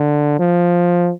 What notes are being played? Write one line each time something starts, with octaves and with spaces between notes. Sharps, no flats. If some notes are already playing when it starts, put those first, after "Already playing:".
Already playing: D3
F3